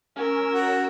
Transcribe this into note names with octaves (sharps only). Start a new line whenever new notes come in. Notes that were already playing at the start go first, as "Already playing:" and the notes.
C#4 A#4 E6
F#4